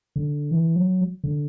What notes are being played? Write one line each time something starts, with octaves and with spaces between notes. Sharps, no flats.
D3
E3
F#3
D3